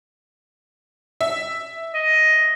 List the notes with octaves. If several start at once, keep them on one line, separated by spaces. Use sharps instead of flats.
E5
D#5